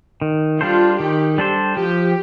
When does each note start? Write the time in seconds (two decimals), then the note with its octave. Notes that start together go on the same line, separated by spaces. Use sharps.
0.21 D#3
0.60 G3 D4 F4 A4 C5
0.99 D#3 G4
1.38 G3 D4 A4 C5
1.76 F3 G4